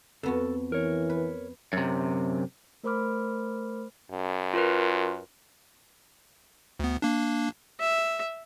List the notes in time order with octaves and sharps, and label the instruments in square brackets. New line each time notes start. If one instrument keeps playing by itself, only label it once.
[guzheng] F2 B3 F#4 [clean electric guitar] A4
[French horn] E3 [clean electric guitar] A#4 C#5
[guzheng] B4
[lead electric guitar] F#2 C3
[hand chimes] A3 A#4 C5 B5 D6 F6
[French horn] F#2
[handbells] F4 A#4 B4
[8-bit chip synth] D2 B3
A#3 D4
[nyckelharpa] E5